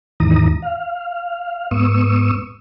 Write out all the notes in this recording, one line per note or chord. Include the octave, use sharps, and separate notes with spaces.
D#2 G#2 D#3 E3 A#5 D#6
F5
G#2 B3 C#6 D#6 E6